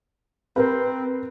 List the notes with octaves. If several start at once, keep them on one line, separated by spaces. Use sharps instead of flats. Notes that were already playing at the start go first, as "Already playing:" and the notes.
C4 A#4 B4